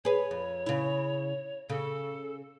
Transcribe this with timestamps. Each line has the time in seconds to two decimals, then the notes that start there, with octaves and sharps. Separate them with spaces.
0.05 G#4 B4 C#5
0.31 F2
0.66 C#3 E4
1.70 C#3 A4